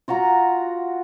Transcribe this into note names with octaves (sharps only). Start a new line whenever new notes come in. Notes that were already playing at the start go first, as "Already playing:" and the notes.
F4 F#4 F5 A#5